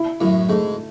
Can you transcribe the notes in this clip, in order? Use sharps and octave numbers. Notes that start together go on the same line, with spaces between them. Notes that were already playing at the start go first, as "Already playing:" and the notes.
Already playing: E4
F#2 A2 E4
G#2 A3